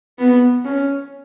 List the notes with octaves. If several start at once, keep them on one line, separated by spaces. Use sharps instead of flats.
B3
C#4